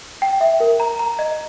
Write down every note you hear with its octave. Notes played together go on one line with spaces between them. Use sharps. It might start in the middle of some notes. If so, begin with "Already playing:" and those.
G5
E5
A#4
A#5
A#5
D#5